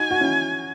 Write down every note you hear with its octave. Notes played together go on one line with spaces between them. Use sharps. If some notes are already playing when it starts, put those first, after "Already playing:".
Already playing: D#4 F#4 G#5
F#4
C#4 E4